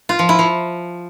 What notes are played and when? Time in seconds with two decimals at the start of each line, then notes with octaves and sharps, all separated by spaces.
0.09 F4
0.19 F3
0.29 E4
0.39 F3